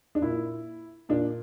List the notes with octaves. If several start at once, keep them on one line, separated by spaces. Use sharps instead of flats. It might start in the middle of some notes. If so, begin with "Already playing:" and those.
D4
A#2 E4
A#2 D4